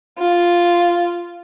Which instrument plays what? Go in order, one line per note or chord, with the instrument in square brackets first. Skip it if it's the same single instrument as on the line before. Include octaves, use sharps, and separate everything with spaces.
[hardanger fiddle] F4